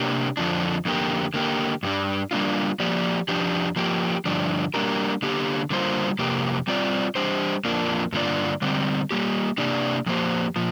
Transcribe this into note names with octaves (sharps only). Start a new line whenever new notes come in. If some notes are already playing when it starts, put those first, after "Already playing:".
Already playing: C3 A#3 D4 G4
F2 D3 F3 D4
F2 D3 A#3 G4
D3 A#3 G4
G2 G3 D4
G3 A#3 D4 F4
F3 A#3 G4 D5
F2 F3 D4 G4
F3 A#3 G4
G2 D3 F3 D4
G3 A#3 D4 G4 A#4
D3 A#3 G4
D3 G3 A#3 F4 C5
F2 C3 A#3 G4
G3 C4 F4 D5
G3 D4 G4 C5
F2 F3 A#3 D4
G2 D3 A#3 F4 D5
D3 G3 C4
G3 A#3 G4
C3 A#3 D4 G4 D5
F2 F3 A#3 G4 C5
A#2 F3